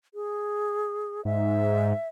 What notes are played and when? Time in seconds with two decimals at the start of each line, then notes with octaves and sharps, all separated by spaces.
0.14 G#4
1.25 G#2 E5